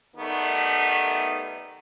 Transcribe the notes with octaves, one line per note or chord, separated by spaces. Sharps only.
D#3 G3 A3 B3